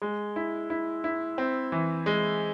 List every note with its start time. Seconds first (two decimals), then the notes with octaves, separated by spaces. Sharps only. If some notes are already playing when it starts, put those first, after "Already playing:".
0.02 G#3
0.36 E4
0.70 E4
1.04 E4
1.38 C4
1.72 E3
2.06 G#3